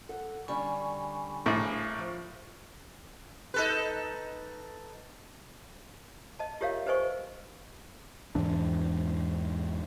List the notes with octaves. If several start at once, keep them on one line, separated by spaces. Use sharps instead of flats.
A4 F#5
D3 G3 C#4 G#5 B5 C#6
A#1 A2
F3
D#4 A4 B4
D#5 A5
F4 G4 A#4 C#5 E5 F5
G4 B4 C5 D#5 G#5 C#6
E2 G#2 E3 D4